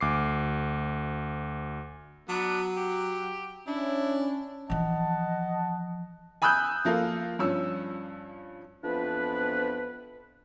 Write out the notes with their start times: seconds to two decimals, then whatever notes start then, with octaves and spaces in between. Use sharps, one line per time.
0.01 D2 D6 C7
2.29 F#3 B3 D4
2.77 G4
3.67 C#4 D4 E4
4.70 E3 F3 D#5 F#5 A5
6.42 G#5 B5 D#6 E6 F#6 G6
6.85 F3 A#3 F4 A4
7.39 G2 F3 C#4 E6
8.83 F2 E3 F3 B3 D4 B4